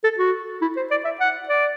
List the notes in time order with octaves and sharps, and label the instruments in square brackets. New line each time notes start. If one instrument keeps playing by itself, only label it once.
[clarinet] A4
F#4
E4
C5
D5
E5
F#5
D5